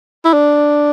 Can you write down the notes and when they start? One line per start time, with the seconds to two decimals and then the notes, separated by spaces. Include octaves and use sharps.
0.25 E4
0.34 D4